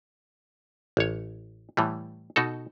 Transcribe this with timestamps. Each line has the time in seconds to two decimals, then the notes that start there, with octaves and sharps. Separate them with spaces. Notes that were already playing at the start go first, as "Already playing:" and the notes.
0.97 A1 C#5
1.77 A2 E3 G3
2.36 B2 D#4 F#4 A4